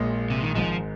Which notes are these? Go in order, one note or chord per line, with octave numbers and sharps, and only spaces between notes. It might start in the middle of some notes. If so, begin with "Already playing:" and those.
Already playing: A#1 A#2 G#3
C3
D#3
G#1 G#2 F3 G#3